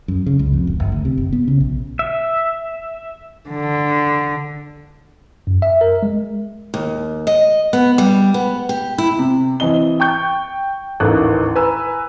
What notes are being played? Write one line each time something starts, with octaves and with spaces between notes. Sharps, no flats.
F#2
C#3
C#2
F2
D1
G1
D2
C3
F#1
B3
C#3
A#1
E5
D3
F#2
E5
A#4
G#3
D#2
D#5
B3
G3
B3
G4
E4
C3
E3 C4 D#5 G7
G5 C#6 G6
A1 D#2 D#3 A4 F#6
B4 G#5 A#5 E6